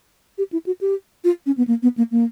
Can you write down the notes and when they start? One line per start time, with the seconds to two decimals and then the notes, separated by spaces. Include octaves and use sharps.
0.38 G4
0.52 E4
0.66 F#4
0.81 G4
1.24 F4
1.46 C#4
1.57 B3
1.68 A#3
1.83 B3
1.97 A#3
2.11 A#3